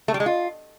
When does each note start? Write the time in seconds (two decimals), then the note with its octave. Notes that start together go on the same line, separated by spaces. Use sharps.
0.08 A3
0.14 G3
0.20 G#3
0.26 F4